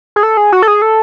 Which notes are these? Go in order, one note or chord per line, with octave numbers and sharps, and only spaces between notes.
G#4
A4
G#4
F#4
A4
G#4
A4